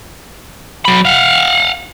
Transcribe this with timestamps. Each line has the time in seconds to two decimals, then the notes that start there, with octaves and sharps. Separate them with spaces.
0.85 F#3 B5
1.05 F5 F#5